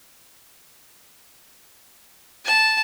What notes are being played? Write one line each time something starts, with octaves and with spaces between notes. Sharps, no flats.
A5